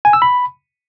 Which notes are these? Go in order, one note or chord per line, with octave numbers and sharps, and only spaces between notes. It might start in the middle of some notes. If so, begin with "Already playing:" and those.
G#5
E6
B5